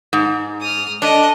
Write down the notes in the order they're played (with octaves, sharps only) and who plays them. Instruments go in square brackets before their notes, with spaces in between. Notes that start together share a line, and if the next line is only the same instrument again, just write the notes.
[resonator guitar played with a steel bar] G#2
[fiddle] D#6 F6
[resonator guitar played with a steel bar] D4 [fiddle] A4 D#5